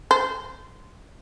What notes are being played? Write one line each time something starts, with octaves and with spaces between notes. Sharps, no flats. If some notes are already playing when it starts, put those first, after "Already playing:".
C5